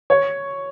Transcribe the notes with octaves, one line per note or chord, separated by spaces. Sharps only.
C#5